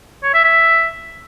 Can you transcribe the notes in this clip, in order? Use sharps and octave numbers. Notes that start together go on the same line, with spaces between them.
C#5
E5
E5